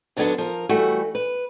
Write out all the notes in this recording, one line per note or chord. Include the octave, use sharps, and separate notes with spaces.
D2 D3 F#3 G3 B3 D4
F3 A#4
E3 G3 A3 F#4
B4